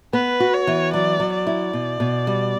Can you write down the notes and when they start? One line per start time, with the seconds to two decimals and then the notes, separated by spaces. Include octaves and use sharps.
0.13 B3 B4
0.40 F#4
0.54 C#5
0.67 E3
0.93 F#3 D5
1.20 F#3
1.34 D5
1.47 E4
1.73 B2
2.00 B2
2.27 G3